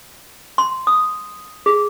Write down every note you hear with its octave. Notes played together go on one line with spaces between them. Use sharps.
C6
D#6
G#4